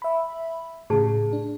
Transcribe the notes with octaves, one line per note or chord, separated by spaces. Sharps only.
E5 B5
A2 C#3 G4 G#4 A5
D4